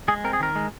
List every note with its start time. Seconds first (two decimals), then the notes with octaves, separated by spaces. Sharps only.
0.08 G#3 G#4
0.24 C4 A#4
0.33 G#4
0.40 D#3 A#4
0.56 G#3